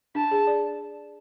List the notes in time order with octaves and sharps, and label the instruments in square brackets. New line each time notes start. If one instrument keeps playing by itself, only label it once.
[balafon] D4 [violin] A5
[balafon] G#4
D5